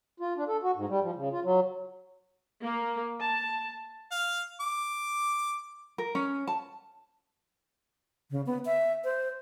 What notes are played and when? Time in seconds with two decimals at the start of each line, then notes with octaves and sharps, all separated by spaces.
0.20 F4
0.37 D4
0.48 A4
0.63 F#4
0.76 G#2
0.89 G3
1.02 F3
1.15 C#3
1.32 F4
1.44 F#3
2.64 A#3
3.21 A5
4.11 F5
4.60 D6
5.98 A#4
6.15 C#4
6.47 A5
8.31 C#3
8.46 B3
8.65 E5
9.05 C5